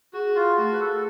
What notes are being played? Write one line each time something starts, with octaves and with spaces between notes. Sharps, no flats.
F#4 G#4
F4
A3 F#4
B4
A4